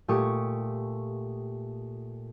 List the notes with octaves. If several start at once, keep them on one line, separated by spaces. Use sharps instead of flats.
A#2 A3 G4 C#6 D#6